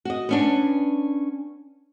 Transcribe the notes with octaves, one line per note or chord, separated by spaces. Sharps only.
F#4 D#5
B3 C#4 D4